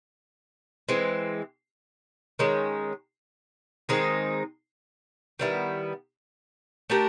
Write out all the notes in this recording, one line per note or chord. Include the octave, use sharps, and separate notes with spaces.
E3 G#3 C4
D#3 G#3 C#4
D#3 G#3 C4 D#4
D#3 G3 B3 E4
A3 D4 G4 A#4